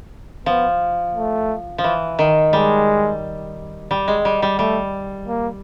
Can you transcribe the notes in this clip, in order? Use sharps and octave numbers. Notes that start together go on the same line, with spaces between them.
F3 B3
A3
F3
E3
D#3
G3 G#3
G3
G#3
G3
G3
G3 A3
A#3